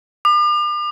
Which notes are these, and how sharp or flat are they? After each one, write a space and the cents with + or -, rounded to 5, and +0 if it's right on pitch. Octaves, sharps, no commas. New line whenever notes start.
D6 +40